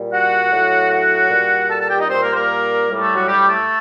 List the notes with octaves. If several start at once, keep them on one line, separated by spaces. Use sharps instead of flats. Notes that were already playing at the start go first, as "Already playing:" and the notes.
Already playing: A#2 G3
F#4 F#5
A2 F#3
F#4 F#5
A#2 G3
A4 A5
A4 A5
G4 G5
D#4 D#5
A#2 G3 C4 C5
A#3 A#4
C5
A#3 A#4
A2 G3
A3 A4
F#3 F#4
G3 G4
A3 A4